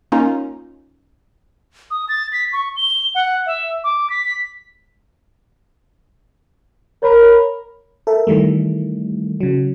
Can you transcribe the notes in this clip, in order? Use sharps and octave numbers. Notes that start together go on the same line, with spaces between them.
A#3 C#4 D#4 F4
D#6
A6
B6
C#6
G7
F#5
E5
D6
B6
A#4 C#5 B5
A4 A#4 E5
D#3 E3 G3 A3
C#3 F#3